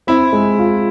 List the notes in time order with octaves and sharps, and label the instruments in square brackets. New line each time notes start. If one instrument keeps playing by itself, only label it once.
[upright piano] C4 [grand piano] E4
[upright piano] G#3
F4